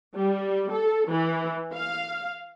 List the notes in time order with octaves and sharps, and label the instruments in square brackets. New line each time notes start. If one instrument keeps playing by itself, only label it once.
[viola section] G3
A4
E3
F5